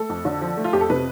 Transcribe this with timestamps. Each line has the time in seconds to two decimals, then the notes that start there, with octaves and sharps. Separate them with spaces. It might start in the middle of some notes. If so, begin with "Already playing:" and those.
Already playing: A3 A4
0.09 F2
0.25 D3
0.41 F3
0.57 A3
0.64 F4
0.73 F2 G4
0.81 A4
0.90 C3 B4